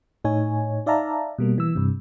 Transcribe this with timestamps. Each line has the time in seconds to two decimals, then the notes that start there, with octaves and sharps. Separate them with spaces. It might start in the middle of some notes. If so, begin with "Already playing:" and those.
0.24 A2 D#4 C#5 G#5
0.86 D#4 D5 E5 F5 A5 A#5
1.38 B2 G3 A#3
1.58 E3 E6
1.75 G2 C3